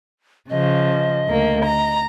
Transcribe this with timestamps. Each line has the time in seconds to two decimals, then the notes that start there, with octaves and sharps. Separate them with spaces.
0.50 C#3 F3 D#5
1.28 D2 A#3
1.65 A#5